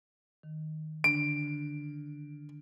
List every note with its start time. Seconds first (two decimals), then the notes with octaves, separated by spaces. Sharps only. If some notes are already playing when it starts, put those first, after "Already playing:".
0.43 D#3
1.04 D3 D4 D7